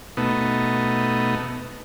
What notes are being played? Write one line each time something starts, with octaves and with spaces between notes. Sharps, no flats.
B2 A3 B3 D#4